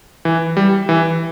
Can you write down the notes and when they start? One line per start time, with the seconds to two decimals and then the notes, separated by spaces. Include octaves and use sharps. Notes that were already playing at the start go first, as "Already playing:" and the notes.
0.25 E3
0.57 G3
0.89 E3